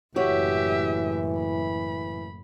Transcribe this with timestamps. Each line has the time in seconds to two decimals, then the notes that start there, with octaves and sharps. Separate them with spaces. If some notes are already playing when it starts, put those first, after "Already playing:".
0.16 F#1 A2 E3 F#4 G4 C#5 E5
1.39 B5